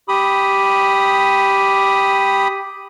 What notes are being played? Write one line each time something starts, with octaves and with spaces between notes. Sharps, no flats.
G4 B5 D#6